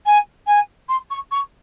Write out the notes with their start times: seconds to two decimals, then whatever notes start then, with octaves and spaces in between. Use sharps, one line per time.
0.05 G#5
0.46 G#5
0.88 C6
1.10 C#6
1.31 C#6